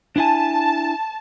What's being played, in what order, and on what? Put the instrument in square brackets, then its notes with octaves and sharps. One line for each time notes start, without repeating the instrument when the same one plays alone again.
[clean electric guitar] D4 E4 G#5 [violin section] A5